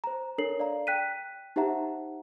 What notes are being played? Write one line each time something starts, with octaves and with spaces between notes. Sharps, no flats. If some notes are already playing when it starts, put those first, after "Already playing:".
C5 A#5
D4 A4 A#4 C#5 C7 F#7
D5 F5 A#5
G5 F#6 B6 D#7
D#4 G4 C5 E5 F#5 A#5